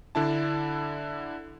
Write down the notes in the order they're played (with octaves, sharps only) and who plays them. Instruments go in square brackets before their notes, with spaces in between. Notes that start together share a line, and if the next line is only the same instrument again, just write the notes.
[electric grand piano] D3 D4 E4 A5